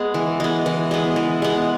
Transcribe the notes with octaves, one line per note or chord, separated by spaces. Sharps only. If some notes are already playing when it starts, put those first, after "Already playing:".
Already playing: G#3 B3 G#4
E3
G#3 B3
E3
G#3 B3
E3
G#3 B3